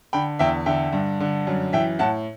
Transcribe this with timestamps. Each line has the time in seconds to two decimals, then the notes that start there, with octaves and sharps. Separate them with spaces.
0.13 D3 G5 B5
0.39 E2 E5 G5
0.66 D3 E5 G5
0.93 G2
1.20 D3
1.47 F#2
1.73 E3 E5 G5
1.99 A2 F#5 A5